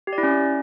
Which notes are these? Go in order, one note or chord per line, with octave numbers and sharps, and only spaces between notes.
G4
D5
E4
C#4